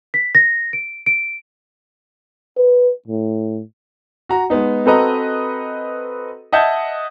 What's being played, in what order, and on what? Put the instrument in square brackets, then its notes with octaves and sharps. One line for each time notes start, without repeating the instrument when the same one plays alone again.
[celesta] B6
A#6
D7
D7
[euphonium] B4
A2
[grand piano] F#4 A#5
G#3 B3 D#4
C4 F#4 A4 B4 D#5 A#5
D#5 E5 F#5 A5 G6 G#6